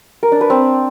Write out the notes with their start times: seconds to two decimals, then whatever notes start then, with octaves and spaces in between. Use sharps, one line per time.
0.23 A#4
0.32 D4
0.41 B4
0.50 C4